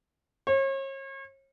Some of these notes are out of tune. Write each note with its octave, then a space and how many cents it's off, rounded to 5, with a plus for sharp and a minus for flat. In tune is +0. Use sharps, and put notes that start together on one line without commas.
C#5 -40